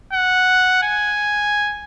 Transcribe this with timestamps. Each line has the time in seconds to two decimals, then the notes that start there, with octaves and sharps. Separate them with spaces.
0.13 F#5
0.83 G#5